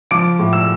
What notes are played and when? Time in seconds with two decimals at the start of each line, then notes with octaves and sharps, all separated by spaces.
0.11 F3 D6 D7
0.39 A2
0.53 E6 E7